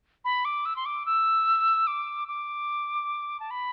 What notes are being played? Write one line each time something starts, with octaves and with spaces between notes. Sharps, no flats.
B5
D6
E6
C6
D6
E6
D6
D6
A5
B5